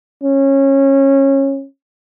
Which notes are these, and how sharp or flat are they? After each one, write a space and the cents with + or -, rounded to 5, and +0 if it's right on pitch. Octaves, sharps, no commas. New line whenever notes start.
C#4 -20